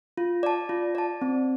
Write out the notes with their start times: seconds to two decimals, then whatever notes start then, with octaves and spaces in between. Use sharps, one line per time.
0.18 F4
0.43 D5 A5
0.69 F4
0.95 D5 A5
1.22 C4